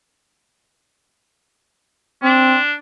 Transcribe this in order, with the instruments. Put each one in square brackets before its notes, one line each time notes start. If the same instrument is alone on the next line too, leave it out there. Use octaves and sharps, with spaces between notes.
[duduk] C4 [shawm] D4